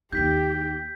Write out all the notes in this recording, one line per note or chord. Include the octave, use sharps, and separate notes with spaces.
D#2 D#4 G4 G5 G6 B6